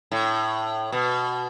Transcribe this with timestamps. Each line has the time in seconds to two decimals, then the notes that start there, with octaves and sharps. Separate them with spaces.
0.12 A2
0.92 B2